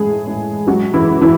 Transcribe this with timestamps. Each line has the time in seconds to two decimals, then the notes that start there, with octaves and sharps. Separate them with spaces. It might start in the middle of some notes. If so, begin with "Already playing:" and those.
Already playing: A2 E3 G#3 A3 G#4
0.27 A2
0.67 F#3 G#3 F#4
0.94 E3 E4
1.08 C#3
1.21 E3 E4